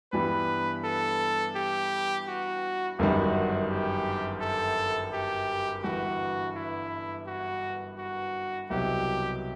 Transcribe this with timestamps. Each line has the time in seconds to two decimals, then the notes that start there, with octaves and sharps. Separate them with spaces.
0.13 G2 E3 G3 B3 B4
0.84 A4
1.56 G4
2.27 F#4
2.98 G1 F#2 D#3 G3 F#4
3.70 G4
4.41 A4
5.13 G4
5.84 G1 G2 E3 F#4
6.56 E4
7.27 F#4
7.98 F#4
8.70 C2 B2 F#3 G4